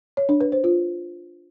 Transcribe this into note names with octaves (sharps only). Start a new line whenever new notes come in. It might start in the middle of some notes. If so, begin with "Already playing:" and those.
C#5
D4
B4
C5
F4